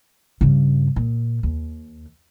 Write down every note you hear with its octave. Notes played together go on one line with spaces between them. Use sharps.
G2 C#3
A#2
D#2